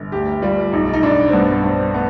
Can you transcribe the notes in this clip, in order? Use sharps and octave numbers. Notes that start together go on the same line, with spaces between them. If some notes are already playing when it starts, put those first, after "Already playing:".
Already playing: G1
D2 G4
G3 F4
B1 D#4
D#4
B1 D4
C4
G2 B3
G2 C4
B3